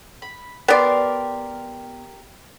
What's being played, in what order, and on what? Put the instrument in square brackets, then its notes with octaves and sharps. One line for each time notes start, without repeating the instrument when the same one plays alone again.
[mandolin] B5
[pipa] B3 D5 [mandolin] G4 A#4 C6